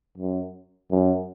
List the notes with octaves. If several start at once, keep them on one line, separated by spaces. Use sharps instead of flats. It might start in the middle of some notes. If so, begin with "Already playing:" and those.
F#2
F#2